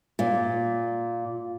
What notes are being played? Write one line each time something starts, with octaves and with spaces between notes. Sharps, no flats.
A#2